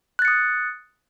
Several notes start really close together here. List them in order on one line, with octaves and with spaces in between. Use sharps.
F#6 A6 C#7 D#6